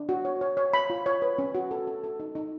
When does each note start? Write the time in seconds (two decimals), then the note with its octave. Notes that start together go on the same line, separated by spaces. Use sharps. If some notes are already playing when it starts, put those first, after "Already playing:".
Already playing: D4
0.09 F#4
0.25 C#5
0.41 C#5
0.57 C#5
0.73 C#5 B5
0.90 F4
1.06 C#5
1.22 B4
1.38 C#4
1.55 F#4
1.71 A4
1.87 A4
2.03 A4
2.20 D#4
2.35 D#4